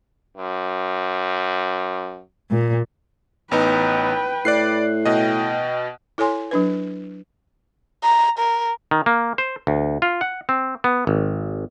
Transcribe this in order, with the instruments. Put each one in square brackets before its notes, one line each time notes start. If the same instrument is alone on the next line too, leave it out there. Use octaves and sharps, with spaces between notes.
[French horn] F#2
[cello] A#2
[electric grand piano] A1 B3 D#4 [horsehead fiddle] B4 G5
[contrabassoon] A2 [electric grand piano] D5 F#6 C7
[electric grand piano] B2 D#5 [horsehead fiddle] G5
[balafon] E4 A4 C#5 G#5 C6
F#3 D4 B4
[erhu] A#5
A#4
[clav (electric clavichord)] D#3
A#3
C5
D2
F4
F#5
C4
B3
G#1